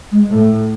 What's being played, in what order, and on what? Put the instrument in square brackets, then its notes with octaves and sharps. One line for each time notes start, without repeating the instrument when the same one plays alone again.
[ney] G#3
[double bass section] A2 [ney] A3